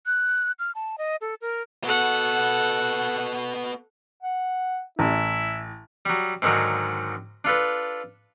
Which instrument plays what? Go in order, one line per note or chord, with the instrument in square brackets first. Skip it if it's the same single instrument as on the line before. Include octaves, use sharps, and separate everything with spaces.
[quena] F#6
F6
A5
D#5
A4
A#4
[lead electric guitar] B3 F#4 [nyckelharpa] A4 F#5
[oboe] F#5
[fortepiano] A1 [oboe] E4
[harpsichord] F#3 G3
G#2 D3 D#3 F#3 G#3
D4 F4 A4 B4